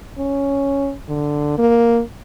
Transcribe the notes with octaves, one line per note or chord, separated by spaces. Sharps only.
C#4
D3
A#3